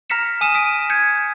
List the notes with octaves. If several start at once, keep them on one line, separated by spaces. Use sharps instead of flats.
A#5 F6 A#6 B6 C#7 E7
G#5 D#6 D#7 E7
D#6 B6 D7
G6 G#6 C#7